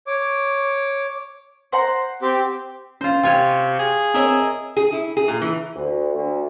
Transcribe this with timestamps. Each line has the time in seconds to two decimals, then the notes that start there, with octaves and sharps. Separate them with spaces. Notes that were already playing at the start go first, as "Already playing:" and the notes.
0.07 C#5 D6
1.72 C5 F#5 A#5
2.22 C4 G4
3.01 C#4 F4 C5
3.23 C3 F4 C#5 G5 G#5
3.79 G#4
4.14 C4 A#4 C#5 D#5 E5
4.77 G#4
4.92 E4
5.17 G#4
5.28 A#2
5.41 E3
5.76 D2
6.14 D2